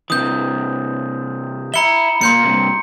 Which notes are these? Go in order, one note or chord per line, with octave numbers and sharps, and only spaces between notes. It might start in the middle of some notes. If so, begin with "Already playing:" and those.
C3 E3 D#6 G6
E5 A#5 B5 C#7 G7
A#2 A#3 C6 G6 C#7
G2 C3